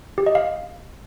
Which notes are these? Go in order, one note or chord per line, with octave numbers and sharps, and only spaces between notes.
G4
D#5
F5